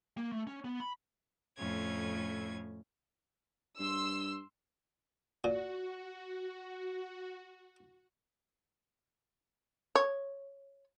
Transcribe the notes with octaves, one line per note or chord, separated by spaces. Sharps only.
A#3
A3
C#4
B3
B5
F2 A2 C#4 G#6
G2 C6 E6
A#2 F#4
C#5